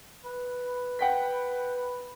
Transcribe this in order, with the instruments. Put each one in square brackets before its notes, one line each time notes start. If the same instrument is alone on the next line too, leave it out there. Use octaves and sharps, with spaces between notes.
[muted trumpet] B4
[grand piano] F#5 G5 B6